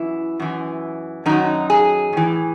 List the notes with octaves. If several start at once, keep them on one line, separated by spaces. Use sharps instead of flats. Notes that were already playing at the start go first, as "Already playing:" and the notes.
Already playing: F#2 E3 E4
F#2 E3
F#2 D#3 F#3 D#4
G#4
A2 E3